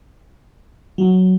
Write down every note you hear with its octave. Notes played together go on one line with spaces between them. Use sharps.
F#3